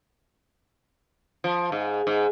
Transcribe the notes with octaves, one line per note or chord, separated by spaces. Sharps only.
F3
G#2
G#2